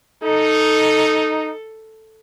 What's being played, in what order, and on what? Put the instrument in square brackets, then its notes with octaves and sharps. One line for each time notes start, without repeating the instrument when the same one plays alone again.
[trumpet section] D#4 [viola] A4